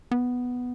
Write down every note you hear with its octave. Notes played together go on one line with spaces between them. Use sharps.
B3